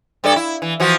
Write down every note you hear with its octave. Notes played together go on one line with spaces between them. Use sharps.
G2 A4 D5
E4
E3
E3 F3 F#4